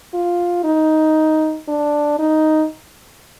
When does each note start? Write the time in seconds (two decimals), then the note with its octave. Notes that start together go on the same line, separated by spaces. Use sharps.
0.14 F4
0.64 D#4
1.68 D4
2.19 D#4